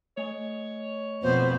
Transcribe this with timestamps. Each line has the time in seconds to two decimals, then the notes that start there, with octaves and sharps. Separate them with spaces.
0.17 A3 C#5 D#5 G#5
1.23 F2 B2 B3 C5